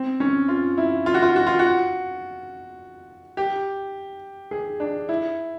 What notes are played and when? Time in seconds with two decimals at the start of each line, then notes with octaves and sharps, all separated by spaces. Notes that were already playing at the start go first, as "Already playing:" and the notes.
Already playing: C4
0.20 C#4
0.48 F4
0.78 E4
1.06 F4
1.14 F#4
1.22 F4
1.36 F#4
1.47 F4
1.59 F#4
3.37 G4
4.51 G#4
4.80 D4
5.09 E4